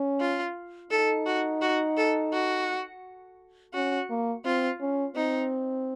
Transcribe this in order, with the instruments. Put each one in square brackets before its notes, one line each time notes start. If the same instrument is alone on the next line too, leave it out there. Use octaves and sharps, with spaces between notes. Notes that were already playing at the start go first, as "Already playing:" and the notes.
Already playing: [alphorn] C#4
[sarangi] F4
[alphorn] D#4 [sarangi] A4
[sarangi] F#4
F#4
A4
F#4
[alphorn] C#4 [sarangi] F#4
[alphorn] A#3
[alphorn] C4 [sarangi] F4
[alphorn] C#4
[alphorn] C4 [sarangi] D#4